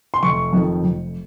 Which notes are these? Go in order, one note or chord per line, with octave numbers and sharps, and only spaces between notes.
C6
F1 C#6
F2 D#3
F1